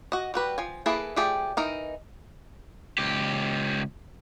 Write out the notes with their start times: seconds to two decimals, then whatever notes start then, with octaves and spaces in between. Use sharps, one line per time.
0.12 F#4 D#5
0.34 G3 F#4 B4
0.58 F3 G#5
0.86 A#3 E4 G#4 A4 B4
1.16 F3 A3 G4 G#4 D5
1.57 E3 D#4 A#4
2.98 C#2 G4